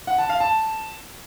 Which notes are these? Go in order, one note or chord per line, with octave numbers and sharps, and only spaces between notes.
F#5
A5
F5
A5